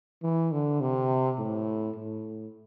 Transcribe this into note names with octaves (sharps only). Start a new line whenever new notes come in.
E3
D3
C3
A2
A2